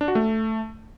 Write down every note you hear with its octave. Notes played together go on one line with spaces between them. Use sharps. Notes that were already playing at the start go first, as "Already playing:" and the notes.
D4
F#4
A3